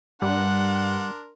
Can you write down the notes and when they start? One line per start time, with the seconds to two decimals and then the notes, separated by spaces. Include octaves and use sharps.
0.22 G2 G3 D4 A#4 F#5 C6